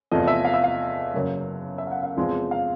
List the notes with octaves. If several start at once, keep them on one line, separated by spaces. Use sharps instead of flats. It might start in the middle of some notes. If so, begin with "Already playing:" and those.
E2 C3 F3 A3 D#5
E5
F5
E5
F5
F#2 C#3 F#3 A#3
E5
F5
F#5
F5
E2 C3 F3 G#3 C4
F5